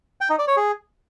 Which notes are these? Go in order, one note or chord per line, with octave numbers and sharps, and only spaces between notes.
G5
D#4
D5
C#5
G#4